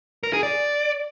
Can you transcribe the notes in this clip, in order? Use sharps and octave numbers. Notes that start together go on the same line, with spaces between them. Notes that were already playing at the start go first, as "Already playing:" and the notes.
A#4
G#4
D5